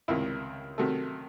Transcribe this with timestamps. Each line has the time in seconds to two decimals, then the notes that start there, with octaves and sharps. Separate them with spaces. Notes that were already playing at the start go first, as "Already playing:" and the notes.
0.08 C#2 C3 D#3 E4
0.78 C3 D#3 F#3 A3